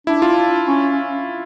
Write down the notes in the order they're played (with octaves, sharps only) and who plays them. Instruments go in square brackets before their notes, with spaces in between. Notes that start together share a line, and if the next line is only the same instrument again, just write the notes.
[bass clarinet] D4 [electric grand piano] E4
[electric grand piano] F4
[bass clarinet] C#4